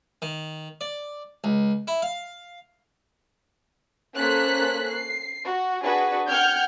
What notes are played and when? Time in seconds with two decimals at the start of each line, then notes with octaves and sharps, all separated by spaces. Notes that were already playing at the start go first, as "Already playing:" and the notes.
0.22 D#3
0.81 D5
1.44 C#2
1.88 E4
2.02 F5
4.17 A#3 C#4 A4 C5 F#6 B6
4.90 C7
5.44 F#4
5.84 D4 F#4 G#4 B4
6.27 F#5 G5 F6 G6 G#6